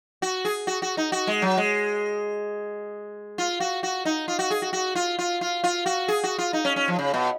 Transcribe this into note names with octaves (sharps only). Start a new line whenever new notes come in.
F#4
G#4
F#4
F#4
D#4
F#4
G#3
F#3
G#3
F4
F#4
F#4
D#4
F4
F#4
G#4
F#4
F#4
F4
F4
F4
F4
F#4
G#4
F#4
F4
D#4
C#4
C#4
F3
C#3
B2